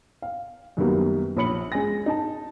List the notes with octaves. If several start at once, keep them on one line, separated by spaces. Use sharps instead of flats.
F5
F#2 D#3 F#3 G3 A#3 B3
A#1 C#5 B5 C#7 F#7
G#3 C#4 G#5 A#6
D#4 A5